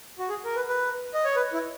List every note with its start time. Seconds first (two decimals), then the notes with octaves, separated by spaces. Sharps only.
0.19 F#4
0.29 G#4
0.44 A#4
0.56 B4
0.69 B4
1.14 D#5
1.25 C#5
1.36 B4
1.53 E4